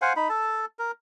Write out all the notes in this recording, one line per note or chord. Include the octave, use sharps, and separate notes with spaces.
C5 F5 F#5 G#5
D#4 B5
A4 A5
A#4